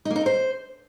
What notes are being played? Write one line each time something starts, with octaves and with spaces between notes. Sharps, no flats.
D#4
A#3
D#4
A#4
C5